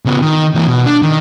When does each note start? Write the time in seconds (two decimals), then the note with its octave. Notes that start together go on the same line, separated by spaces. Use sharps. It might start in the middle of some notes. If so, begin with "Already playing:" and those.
0.05 C#3 B3
0.21 D#3
0.55 E3 A#3
0.67 B2
0.86 D4
1.02 D#3